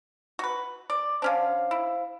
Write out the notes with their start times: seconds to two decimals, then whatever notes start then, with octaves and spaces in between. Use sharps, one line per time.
0.39 F#4 B4
0.90 D5
1.22 D3 C#4 D4 C5 F5
1.71 E4